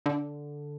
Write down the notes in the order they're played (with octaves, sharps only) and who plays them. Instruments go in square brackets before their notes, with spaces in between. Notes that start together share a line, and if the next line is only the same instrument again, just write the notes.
[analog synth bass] D3